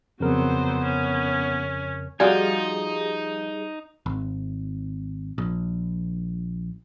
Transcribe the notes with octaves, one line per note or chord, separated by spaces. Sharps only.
F2 C#3 F#3 B3 A#4 C5
C#4
F3 G3 D#4 F4 F#4 G#4 D5 G#5
G#1
A#1